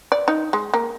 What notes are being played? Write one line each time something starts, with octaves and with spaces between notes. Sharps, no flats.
D5
D#4
G#3
A#3